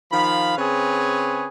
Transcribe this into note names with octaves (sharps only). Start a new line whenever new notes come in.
D#3 F3 F5 B5
C#3 C4 G#4 B4 C#5